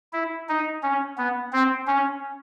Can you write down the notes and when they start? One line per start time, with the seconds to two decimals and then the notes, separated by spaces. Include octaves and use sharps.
0.13 E4
0.49 D#4
0.83 C#4
1.18 B3
1.53 C4
1.87 C#4